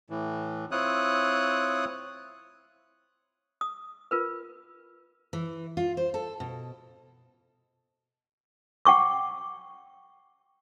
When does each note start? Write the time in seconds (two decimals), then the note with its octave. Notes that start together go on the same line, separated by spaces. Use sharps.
0.10 A2 E3
0.71 C4 E4 F4 C#5 D#6 F#6
3.61 D#6
4.11 F4 A#4 B4
5.33 E3
5.77 F4
5.97 C5
6.14 A4
6.40 B2
8.85 F#5 G5 C#6 D6